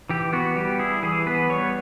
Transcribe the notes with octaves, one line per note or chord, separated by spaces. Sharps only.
E3 G4
B3 F#4
G3 G4
E4 G#4
E3 G#4
B3 B4
G3 C#5